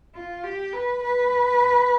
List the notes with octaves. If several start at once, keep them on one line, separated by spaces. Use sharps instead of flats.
F4
G4
B4
B4